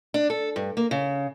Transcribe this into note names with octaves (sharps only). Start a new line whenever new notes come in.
D4
A4
G2
A#3
C#3